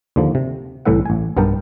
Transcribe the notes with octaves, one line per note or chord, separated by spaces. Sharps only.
D#2 D3 F3
C3
C2 A2 E3 E4 E5 F#5
A1 G#5
B1 G2 B3 A#4 G5 A5